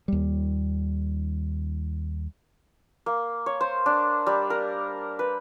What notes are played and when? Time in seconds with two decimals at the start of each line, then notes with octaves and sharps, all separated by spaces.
0.08 D#2 G3
3.06 A#3
3.46 C#5
3.61 C5
3.86 D4
4.27 G3
4.50 A#4
5.19 B4